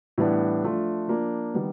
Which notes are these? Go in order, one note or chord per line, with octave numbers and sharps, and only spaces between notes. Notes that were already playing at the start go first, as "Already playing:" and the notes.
A2 E3 G3 B3 D4
F3 A3 D4 F4
F3 A#3 D4
D#3 G3 B3